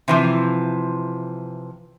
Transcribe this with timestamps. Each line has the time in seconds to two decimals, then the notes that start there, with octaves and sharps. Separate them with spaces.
0.08 C3 E3 F3